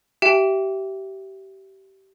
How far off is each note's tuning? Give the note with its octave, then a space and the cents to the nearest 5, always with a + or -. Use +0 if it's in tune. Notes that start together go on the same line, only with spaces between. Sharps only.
G4 -25 E5 +10 G5 +0